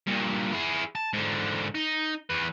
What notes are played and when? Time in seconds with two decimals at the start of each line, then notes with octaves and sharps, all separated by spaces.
0.07 G2 A#2
0.53 E4 G#4
0.95 A5
1.13 G#2 D3
1.75 D#4
2.30 E2 B4